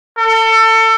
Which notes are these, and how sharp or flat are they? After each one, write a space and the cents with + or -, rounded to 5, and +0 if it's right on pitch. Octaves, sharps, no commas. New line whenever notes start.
A4 +30